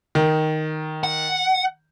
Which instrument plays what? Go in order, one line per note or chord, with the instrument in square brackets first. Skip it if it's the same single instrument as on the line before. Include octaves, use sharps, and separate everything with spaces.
[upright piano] D#3
[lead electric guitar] F#5